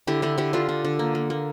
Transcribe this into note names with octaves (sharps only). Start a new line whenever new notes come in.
D3 E4 G4
D3 E4 G4
D3 E4 G4
D3 D4 F4
D3
D3
A#3
A#3
A#3